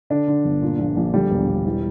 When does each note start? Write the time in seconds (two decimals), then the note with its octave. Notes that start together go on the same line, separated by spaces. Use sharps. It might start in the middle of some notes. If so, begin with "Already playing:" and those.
0.10 D3 D4
0.27 D3
0.45 G1
0.62 A#2
0.79 A#1
0.97 A#1
1.13 D3 G3
1.31 E1
1.48 E1
1.65 E3